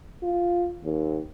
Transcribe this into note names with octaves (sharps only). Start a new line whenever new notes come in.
F4
D#2